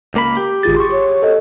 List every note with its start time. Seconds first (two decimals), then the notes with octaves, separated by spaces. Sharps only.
0.14 C#2 A#3 B5
0.37 G4
0.63 G#1 F4 G#4 A6
0.76 C6 C#6
0.92 C#5
1.23 A4 D#5